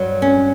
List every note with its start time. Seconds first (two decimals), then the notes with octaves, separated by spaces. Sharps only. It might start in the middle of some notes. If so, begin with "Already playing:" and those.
Already playing: G2 F#3
0.22 C#4